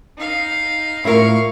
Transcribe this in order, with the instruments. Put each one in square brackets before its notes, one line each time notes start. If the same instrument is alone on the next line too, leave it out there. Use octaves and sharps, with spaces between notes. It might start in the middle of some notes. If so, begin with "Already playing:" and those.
[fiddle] D#4 F5
[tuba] A2 [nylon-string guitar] E4 F4 A#4 [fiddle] F5 C#6